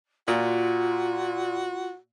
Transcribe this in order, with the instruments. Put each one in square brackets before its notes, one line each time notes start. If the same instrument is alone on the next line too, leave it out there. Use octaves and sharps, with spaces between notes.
[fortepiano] A#2 [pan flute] F4 [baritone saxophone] F#4